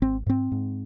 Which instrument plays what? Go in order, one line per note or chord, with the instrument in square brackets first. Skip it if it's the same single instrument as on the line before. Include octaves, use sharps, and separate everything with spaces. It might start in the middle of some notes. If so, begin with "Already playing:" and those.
[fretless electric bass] G#1 C4
G#2 C4
G#2